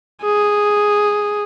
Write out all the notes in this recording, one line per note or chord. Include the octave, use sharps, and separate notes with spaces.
G#4